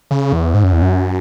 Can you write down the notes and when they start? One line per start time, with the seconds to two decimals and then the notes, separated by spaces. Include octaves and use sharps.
0.11 C#3
0.33 E2
0.54 G#2
0.64 F#2
0.73 E2
0.82 F#2